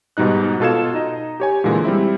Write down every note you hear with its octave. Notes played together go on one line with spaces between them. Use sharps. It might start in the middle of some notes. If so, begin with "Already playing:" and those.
G#2 B2 G3 D#4 F#6
B2 F4 A4 F5 G#6 E7
D#4 D#5
G4 C#5 G#5
A#2 D3 E3 G#3
G3 C4 E4